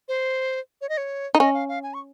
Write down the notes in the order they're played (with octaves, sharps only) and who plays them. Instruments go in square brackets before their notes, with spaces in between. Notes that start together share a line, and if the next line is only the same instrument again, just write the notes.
[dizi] C5
C#5
D#5
C#5
[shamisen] D#4
[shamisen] C#4 [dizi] D#5
[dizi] F5
F5
G#5
C#6